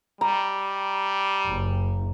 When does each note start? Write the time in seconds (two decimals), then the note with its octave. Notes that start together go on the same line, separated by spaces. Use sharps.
0.21 G3 A#5
1.47 F#1